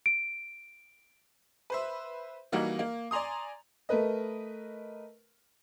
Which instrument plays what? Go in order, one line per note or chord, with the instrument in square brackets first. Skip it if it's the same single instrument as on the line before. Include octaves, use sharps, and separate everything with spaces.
[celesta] D7
[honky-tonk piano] B4 C5 E5
E3 G3 A#3 D#4 F#4
A#3
D5 G#5 A#5 C6 D#6
A3 A#4 B4 D#5